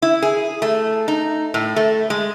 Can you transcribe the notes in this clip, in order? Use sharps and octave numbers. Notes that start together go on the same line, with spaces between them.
E4
G#4
A3
D#4
A2
A3
G#3